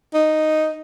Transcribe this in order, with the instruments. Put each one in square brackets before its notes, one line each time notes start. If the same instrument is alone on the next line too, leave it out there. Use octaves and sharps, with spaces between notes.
[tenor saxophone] D#4